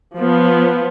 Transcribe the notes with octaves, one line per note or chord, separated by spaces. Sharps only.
F3 B3